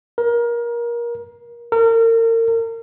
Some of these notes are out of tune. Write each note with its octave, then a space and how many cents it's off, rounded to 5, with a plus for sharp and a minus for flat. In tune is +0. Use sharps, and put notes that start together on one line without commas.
A#4 +25
A#4 -35